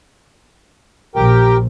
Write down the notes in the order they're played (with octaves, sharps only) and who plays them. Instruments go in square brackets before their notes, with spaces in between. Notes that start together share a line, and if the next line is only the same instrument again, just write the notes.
[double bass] A#1 [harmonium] G4 A#4 G5